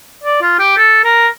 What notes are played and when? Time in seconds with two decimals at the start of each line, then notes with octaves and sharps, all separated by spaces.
0.24 D5
0.41 F4
0.59 G4
0.77 A4
1.04 A#4